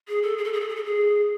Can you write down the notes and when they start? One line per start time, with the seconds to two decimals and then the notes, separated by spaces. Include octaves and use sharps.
0.08 G#4
0.23 A4
0.37 G#4
0.44 A4
0.53 G#4
0.60 A4
0.69 G#4
0.76 A4
0.84 G#4